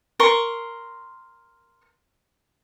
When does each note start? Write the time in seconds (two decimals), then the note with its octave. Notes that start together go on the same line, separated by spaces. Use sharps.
0.20 A#4 C6 C#6